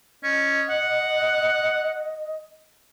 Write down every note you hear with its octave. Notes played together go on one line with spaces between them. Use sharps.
C#4 D#5
F#5